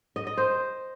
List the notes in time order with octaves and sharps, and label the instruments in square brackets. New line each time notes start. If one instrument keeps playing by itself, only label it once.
[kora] D#5
D#5
C5